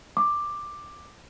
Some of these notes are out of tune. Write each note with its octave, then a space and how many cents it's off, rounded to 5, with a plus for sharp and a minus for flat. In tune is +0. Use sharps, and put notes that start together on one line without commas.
D6 +10